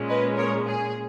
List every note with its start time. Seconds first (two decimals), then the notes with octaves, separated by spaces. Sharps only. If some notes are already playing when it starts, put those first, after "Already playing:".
Already playing: A#2 G#3 C#4
0.09 B4 D#5
0.37 A#4 C#5
0.66 G#4